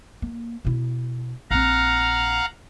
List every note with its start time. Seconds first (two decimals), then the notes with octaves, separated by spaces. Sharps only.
0.22 A#3
0.65 B2 E4
1.51 A#1 C4 F5 F#5 A#5